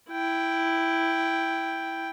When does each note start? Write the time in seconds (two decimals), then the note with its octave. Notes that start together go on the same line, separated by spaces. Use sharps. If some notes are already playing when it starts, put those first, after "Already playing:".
0.11 E4 G5